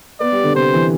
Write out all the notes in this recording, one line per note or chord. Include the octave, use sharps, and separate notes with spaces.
B3 D5
G3
D3
C3 C5
E3